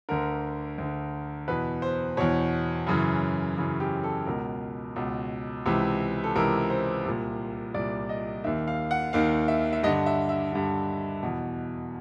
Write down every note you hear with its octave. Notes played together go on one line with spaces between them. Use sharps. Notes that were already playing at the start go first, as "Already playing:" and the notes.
D2 D3 A#4
D2 D3
E2 B2 B4
C5
E2 B2 C#5
F#2 C#3 E3
F#2 C#3 E3
G4
A4
C#2 B2 A#4
C#2 B2
C#2 C3 E3
A4
C#2 C3 E3 A#4
C5
C2 A#2
C2 A#2 D5
D#5
D#2 D#3 E5
F5
F#5
D#2 D#3 F5
E5
E5
G2 D3 D#5
E5
E5
G2 D3
E2 B2